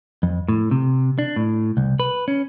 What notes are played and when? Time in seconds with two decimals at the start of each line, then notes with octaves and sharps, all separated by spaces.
0.23 F2
0.49 A2
0.71 C3
1.19 D4
1.36 A2
1.77 C2
2.00 B4
2.28 C#4